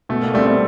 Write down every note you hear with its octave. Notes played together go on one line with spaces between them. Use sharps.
B2 A3
A#3
G3 A3 C4
A3